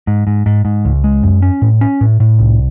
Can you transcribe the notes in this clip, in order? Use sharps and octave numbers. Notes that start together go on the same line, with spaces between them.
G#2
G#2
G#2
G#2
C#2
G#3
F#2
C#4
A2
C#4
A2
A2
C2